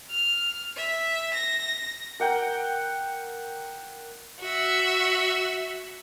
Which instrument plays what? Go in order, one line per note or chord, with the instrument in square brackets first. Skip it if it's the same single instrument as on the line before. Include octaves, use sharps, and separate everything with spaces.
[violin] F6
E5
A#6
[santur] A#4 F#5 G5
[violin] F#4 E5